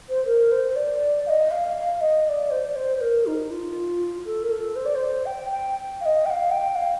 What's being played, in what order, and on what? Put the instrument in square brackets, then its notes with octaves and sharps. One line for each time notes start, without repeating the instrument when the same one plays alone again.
[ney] C5
A#4
C5
D5
F5
D#5
F5
F5
D#5
D#5
D5
C5
D5
C5
C5
A#4
D#4
F4
A4
A#4
A4
C5
D5
C5
G5
G5
F5
D#5
G5
F5
G5
F5